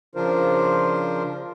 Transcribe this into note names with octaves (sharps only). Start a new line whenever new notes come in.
C#3 F3 D4 F4 A#4 C5